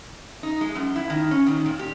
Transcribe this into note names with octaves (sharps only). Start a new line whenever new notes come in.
D#4
G#3
F#2
E4
D#3
C#4
D#3
A#2
G4